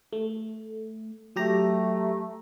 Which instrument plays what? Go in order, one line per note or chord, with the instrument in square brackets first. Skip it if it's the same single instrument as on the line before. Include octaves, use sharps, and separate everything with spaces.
[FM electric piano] A3
[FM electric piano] F#3 G4 A#5 [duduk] A3